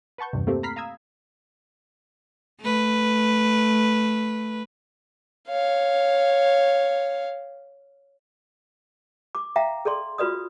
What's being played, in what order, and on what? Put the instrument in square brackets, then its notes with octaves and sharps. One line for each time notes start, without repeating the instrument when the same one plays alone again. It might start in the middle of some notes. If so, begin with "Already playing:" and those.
[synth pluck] B4 F#5 A5 C#6 G6
E2 G2 C3
A3 A#3 C4 G4 A4
A#5 B5 F6 B6 C7
F5 A#5 D#6 E6 G#6
[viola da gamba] A3 B4
[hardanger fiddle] C#5 F5
[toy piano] D6
E5 F5 G5 A#5
G#4 A4 D5 C6
F4 F#4 B4 D5 D#6